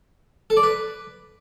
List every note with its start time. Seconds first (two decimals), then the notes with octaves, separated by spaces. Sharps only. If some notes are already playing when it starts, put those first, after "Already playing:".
0.50 A4
0.57 D5
0.63 B4